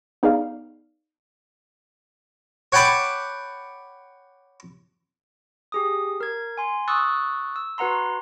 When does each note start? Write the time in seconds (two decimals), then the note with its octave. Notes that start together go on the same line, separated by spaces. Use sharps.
0.23 B3 D#4 G#4 D5 F5
2.72 C#5 F#5 G5 A5 B5 D6
5.72 G4 G#4 D#6
6.20 A#4 G#6
6.58 G#5 C6
6.88 C#6 D#6 E6 F#6 A6
7.56 E6
7.78 F#4 B4 F#5 A#5 C6